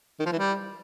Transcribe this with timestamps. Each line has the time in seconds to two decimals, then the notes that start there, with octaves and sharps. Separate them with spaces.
0.19 D#3
0.26 F3
0.32 E3
0.39 G3